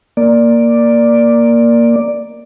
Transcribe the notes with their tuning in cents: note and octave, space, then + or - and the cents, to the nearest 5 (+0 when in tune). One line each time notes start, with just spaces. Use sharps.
A#3 +0 D5 +0